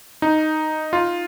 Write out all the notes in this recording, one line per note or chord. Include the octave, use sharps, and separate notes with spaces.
D#4
F4